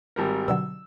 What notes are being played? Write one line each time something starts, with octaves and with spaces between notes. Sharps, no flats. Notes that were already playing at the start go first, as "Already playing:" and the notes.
G#1 G3 A#4
B2 D3 F#3 E6